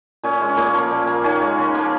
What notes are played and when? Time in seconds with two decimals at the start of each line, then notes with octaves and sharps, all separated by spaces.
0.24 A#2 C#4
0.41 G#3
0.49 C#4
0.57 A#2 A#3
0.74 F3 A#3
0.91 A#2
1.07 A#3
1.24 D#3 C#4
1.41 G#3
1.58 C#3
1.75 F3 A#3